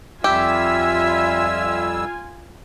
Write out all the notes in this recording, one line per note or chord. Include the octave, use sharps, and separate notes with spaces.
F2 G3 F4 G4 E5 G#5 E6